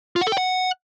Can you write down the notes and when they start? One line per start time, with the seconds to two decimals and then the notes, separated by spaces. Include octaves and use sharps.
0.16 F4
0.21 F#5
0.27 A4
0.32 G5
0.38 F#5